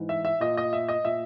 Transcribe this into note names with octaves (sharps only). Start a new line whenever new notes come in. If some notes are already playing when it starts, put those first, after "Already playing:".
Already playing: G#2 E3
E5
E5
A#2 D#5
D#5
E5
D#5
A#2 E5